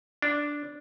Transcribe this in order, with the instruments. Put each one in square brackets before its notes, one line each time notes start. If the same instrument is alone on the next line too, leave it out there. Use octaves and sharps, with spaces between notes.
[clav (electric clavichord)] D4